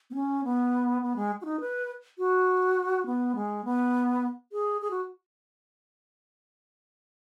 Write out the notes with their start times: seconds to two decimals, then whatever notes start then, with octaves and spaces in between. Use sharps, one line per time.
0.10 B3
0.15 C#4
0.44 B3
1.02 B3
1.16 G#3
1.41 F#4
1.45 D#4
1.60 B4
2.18 F#4
3.06 B3
3.35 G#3
3.65 B3
4.52 G#4
4.81 G#4
4.91 F#4